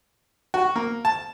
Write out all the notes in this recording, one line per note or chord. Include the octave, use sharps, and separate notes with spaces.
F#4
A#3
A5